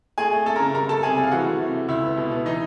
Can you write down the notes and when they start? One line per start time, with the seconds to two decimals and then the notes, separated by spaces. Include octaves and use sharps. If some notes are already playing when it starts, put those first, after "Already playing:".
0.18 A3 G#4 G#5
0.32 A3
0.46 A3 A4 A5
0.56 A#4 A#5
0.60 C#3
0.75 G3 A#4 A#5
0.89 G3 A4 A5
1.03 C3 G#4 G#5
1.17 G3
1.23 F5
1.31 E3 F#4 F#5
1.46 A3
1.60 C3
1.74 A3
1.88 C#2 E4 E5
2.03 B3
2.17 B2
2.31 B3
2.45 E3 D#4 D#5